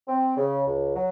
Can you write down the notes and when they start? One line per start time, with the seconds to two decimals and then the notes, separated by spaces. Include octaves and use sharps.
0.08 C4
0.37 C#3
0.67 C#2
0.95 F#3